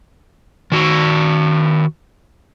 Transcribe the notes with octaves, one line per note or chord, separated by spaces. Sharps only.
D#3 F#4